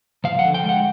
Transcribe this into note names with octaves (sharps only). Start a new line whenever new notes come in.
F3 F5
F#5
D3
G5
G#3
F#5